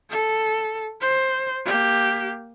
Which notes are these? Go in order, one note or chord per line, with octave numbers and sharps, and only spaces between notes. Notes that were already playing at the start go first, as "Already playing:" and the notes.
A4
C5
A#3 G4